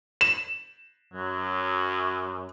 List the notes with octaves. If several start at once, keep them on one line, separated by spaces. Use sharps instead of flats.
E7
F#2 F#3